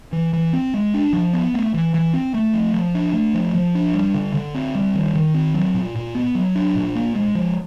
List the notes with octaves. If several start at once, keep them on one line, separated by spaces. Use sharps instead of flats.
E3
E3
C4
G#3
D4
F3
B3
A3
E3
E3
C4
A3
F3
F3
D4
A3
F3
F3
D4
G3
D3
D3
C4
G3
D#3
D#3
C4
F#3
A#2
A#2
B3
F#3
D4
A#2
A#3
G#3
F3